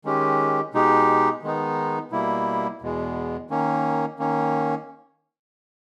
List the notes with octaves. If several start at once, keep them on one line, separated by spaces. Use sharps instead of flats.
D#3 G#3 C#4 G4
B2 G#3 D#4 G4
D#3 G#3 B3 D#4
B2 G3 A#3 E4
E2 B2 G#3
D#3 A#3 C#4
D#3 A#3 C#4